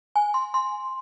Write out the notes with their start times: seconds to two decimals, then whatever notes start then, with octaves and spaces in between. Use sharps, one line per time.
0.16 G#5
0.34 C6
0.54 C6